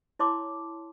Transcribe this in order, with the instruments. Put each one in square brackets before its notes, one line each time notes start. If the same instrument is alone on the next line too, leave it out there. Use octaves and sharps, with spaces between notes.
[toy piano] E4 C#5 A5 C6 D6